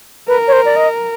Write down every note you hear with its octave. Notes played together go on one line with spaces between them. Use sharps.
A#4 B4
C#5
C5
D5
D#5